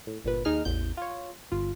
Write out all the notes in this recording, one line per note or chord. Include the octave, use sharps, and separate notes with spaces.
A2
G1 A#2 B4
D#2 D#4 G#4 F6
A1 E2 G6
F4 C#5
G1 F4